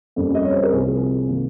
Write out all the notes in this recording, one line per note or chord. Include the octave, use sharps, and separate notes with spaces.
F2 C#3 G3 A#3
D#5
C#5
C5
A#4
C2 C3 F3 C4 G#4
C3 D#3 A#3